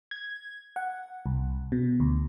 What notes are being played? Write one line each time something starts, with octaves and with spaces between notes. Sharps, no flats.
G#6
F#5
C2
B2
D2